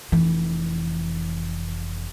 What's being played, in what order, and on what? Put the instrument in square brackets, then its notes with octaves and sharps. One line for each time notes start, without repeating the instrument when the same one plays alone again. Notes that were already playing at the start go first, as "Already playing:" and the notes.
[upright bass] F1 E3